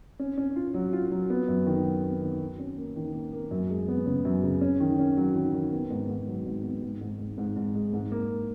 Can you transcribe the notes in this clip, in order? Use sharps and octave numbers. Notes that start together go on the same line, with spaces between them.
C#4
C#4
F4
F#3
F4
F#3
B3
F#2
D#3
F#3
B3
D#3
F#3
C#4
A#3
D#3
A#3
A#3
F#2
G#3
B3
C#3
F#2
C#3
C#4
D#3
C#4
F#3
D#3
D#3
B3
G#2
G#2
F#3
G#2
B3
G#2
G#2
G#2
G#2
G#2
G#3
G#2
A#3